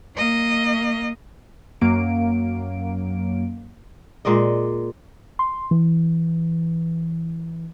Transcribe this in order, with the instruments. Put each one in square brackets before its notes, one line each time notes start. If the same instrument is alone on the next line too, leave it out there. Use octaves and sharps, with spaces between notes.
[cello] A#3 D#5
[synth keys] F#2 F#3 A#3 F5 D7
[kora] A#2 G#3 D5 D#5
[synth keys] C6
E3